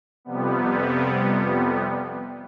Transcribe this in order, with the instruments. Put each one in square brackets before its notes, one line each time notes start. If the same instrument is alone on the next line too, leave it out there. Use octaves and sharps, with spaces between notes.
[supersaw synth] F2 C3 G3 B3